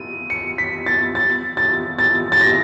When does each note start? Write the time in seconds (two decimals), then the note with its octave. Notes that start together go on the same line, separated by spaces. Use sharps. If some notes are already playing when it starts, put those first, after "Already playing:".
Already playing: D#7
0.30 C#7
0.58 B6
0.86 A6
1.15 A6
1.57 A6
1.98 A6
2.32 A6
2.41 A#6